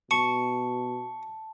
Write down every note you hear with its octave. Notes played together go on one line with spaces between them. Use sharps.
B2 A5 C#6